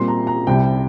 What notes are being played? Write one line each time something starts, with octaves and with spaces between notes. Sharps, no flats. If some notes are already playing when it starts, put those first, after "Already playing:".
Already playing: A#2 G3 C4 C6
A#5
A#5
C2 C3 G3 G5